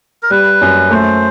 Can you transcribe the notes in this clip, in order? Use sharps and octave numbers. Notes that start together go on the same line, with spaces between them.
A#4
G3 B4
F#2
A3 C5